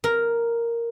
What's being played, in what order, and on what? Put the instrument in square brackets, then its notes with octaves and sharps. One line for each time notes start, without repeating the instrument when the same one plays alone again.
[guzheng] A#4